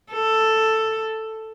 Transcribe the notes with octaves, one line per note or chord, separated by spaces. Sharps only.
A4